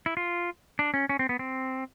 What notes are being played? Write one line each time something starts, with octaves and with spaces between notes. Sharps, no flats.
E4
F4
D4
C#4
C#4
C4
B3
C4